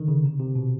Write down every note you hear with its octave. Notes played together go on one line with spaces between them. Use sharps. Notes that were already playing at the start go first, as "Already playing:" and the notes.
Already playing: D3 D#3
C#3
C3
C3
B2